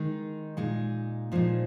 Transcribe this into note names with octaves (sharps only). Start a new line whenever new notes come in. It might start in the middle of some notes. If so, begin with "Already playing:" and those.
Already playing: D#3 G#3 D#4
A#2 G#3 D#4
A#2 F3 G#3 D#4